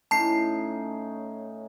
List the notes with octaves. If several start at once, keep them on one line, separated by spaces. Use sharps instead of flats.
A2 C#4 D#4 A5 C7